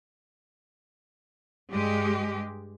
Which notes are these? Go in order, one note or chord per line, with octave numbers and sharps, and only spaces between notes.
G2 G#3 G4